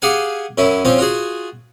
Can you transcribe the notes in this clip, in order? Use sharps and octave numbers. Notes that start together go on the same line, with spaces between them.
G4 G#4 F5 F#5 G#5
F#2 C#4 E4
F3 C4 C#4 F5
F4 F#4 G#4